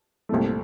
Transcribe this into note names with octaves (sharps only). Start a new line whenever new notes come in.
C2 A#2 A3